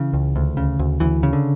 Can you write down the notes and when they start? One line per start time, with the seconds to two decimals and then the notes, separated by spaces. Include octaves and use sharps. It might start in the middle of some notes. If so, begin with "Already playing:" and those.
Already playing: C#3 E3
0.13 C#2
0.36 D2
0.57 C#3
0.79 D2
1.00 D2 E3
1.23 C#3
1.33 D3